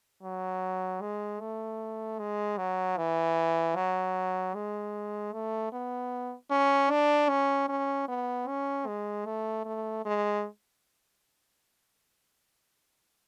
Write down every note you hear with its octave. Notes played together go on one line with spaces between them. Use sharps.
F#3
G#3
A3
G#3
F#3
E3
F#3
G#3
A3
B3
C#4
D4
C#4
C#4
B3
C#4
G#3
A3
A3
G#3